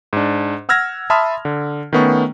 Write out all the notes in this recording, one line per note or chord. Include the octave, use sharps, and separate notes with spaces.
G#2 D4
F#5 E6 F6 G#6 A#6
E5 A5 B5 C6 D#6 F6
D3
D#3 A3 B3 C#4 C#6